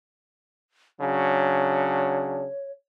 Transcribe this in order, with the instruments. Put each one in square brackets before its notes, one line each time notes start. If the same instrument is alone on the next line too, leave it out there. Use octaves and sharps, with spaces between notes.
[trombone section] C#3 F#3 D4 [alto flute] C#5